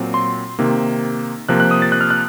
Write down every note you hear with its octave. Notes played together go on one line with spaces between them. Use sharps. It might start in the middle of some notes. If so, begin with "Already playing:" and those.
Already playing: A#2 F#3 C4
C6
C3 D#3 A#3
C3 F3 A#3 F#6
F#6
D#6
A6
F#6
F6
F#6